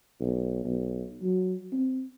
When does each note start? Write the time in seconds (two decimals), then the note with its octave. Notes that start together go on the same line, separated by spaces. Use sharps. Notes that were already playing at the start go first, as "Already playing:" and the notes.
0.20 B1
0.65 B1
1.22 F#3
1.72 C4